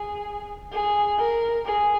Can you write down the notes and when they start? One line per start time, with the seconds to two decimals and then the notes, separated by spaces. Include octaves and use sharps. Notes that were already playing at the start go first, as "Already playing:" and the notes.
Already playing: G#4
0.72 G#4
1.18 A#4
1.65 G#4